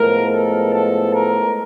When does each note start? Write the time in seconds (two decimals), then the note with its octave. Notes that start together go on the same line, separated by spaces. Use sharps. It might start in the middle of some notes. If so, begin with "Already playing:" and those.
Already playing: A2 F3 G#3 B3 A#4
0.31 A4
0.71 A4
1.13 A#4